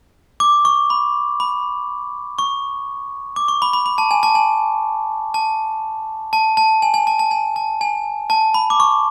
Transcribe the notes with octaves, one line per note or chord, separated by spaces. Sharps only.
D6
C#6
B5
B5
C#6
D6
C#6
B5
B5
B5
A5
G#5
A5
G#5
A5
A5
A5
G#5
G#5
A5
A5
G#5
A5
G#5
A5
B5
D6
C#6